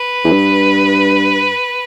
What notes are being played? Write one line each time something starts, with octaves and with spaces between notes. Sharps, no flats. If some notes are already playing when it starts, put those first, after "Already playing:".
Already playing: B4
E2
G2